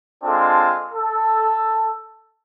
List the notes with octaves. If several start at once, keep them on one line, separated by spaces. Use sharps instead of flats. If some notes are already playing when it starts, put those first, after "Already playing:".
G#3 C4 D4 F4 A4 F5
A4